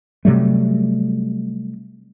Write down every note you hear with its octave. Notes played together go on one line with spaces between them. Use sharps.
C3 F#3 G3 A3